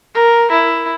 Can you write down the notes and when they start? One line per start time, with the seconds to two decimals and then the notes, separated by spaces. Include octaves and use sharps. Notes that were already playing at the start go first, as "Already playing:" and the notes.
0.15 A#4
0.51 E4